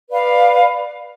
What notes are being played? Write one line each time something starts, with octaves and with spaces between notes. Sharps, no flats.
B4 D5 F5